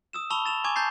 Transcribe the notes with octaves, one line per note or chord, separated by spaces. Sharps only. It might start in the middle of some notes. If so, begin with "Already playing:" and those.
D#6 E6 E7
A5 B5 C#6 E6 F7 G7
A6 E7 F7
G#5 C#6 D6 G#6
A5 A#5 G6 A6 C7